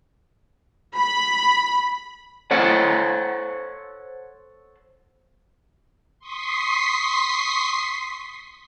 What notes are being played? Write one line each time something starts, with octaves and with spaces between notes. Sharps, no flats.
B5
A4 C5 C#5 F#5
C6 C#6 D#6 B6 C7